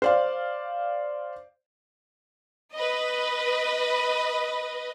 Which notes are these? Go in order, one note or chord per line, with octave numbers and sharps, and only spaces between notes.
C5 D5 F5
B4 D#5